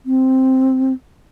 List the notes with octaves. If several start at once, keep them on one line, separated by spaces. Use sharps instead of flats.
C4